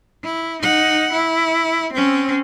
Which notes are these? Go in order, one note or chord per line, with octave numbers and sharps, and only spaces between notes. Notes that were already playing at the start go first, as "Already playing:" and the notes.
E4
D#4 F#5
E4
C4 C#4